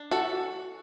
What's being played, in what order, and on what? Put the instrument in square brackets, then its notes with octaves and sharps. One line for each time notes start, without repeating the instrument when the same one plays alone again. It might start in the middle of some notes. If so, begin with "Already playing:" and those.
Already playing: [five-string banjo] D4
E3 F#4 A4